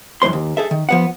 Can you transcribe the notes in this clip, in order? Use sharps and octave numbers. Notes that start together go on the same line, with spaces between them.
F#2 E3 A#3 C5 C6
D#2
G#4 A4 E5
D#3
F3 B3 F#5